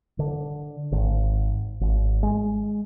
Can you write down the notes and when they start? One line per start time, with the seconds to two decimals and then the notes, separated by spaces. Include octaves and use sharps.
0.19 D3
0.92 G#1
1.81 G#1
2.23 G#3